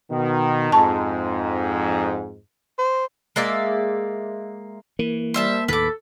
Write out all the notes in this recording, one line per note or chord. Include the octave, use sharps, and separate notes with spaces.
B2 D#3
F2 G#2 A5 C#6
C5
G#3 A#3 D5 E5
E3 A#3
G3 C5 E5 A5
D#2 A2 A4 B4 D6